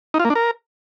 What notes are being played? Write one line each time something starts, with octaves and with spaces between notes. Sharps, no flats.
D#4
F4
A#3
D4
A#4